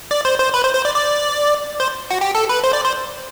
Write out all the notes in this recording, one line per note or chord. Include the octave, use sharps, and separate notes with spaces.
D5
C5
C5
B4
C5
C5
D5
D5
C5
F#4
G4
A4
B4
C5
D5
C5